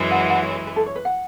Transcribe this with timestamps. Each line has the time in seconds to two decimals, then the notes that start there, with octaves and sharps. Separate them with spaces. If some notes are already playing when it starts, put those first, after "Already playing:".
Already playing: F#2 E3 G#3
0.11 F#5
0.30 F#5
0.43 C#5
0.55 B4
0.67 B4
0.76 A4
0.86 C#5
0.96 B4
1.05 F#5